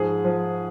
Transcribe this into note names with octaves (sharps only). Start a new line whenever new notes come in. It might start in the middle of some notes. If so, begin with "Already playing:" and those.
Already playing: G#2 F3 G#4
F3